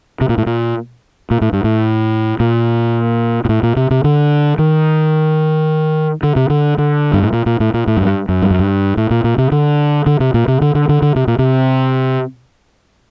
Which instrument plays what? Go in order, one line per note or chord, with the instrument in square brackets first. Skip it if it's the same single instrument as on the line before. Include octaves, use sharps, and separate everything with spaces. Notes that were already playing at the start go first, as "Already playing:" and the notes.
[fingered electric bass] C3
A#2
A2
A#2
A#2
A2
G2
A2
A#2
A#2
A2
A#2
C3
C3
D3
D#3
D3
C3
D3
D3
G2
A2
A#2
A#2
A2
A#2
A2
F#2
G2
F#2
G2
F#2
G2
A2
A#2
A#2
C3
D3
D3
C3
A#2
C3
D3
D3
D3
D3
C3
A#2
C3